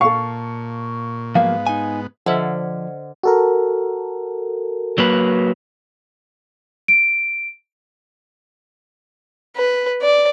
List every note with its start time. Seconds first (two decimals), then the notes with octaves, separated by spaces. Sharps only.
0.01 A#2 A4 F5 C#6
1.35 G#2 F3 F#3 A#3 B3 F5
1.67 D#4 G#5
2.26 D3 F3 A4 C5 D#5 E5 F#5
3.23 F#4 A4 A#4
4.98 F#3 A#3 B4
6.88 D7
9.57 B4
10.02 D5